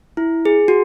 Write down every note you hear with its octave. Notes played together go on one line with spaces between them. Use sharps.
E4
G#4
F#4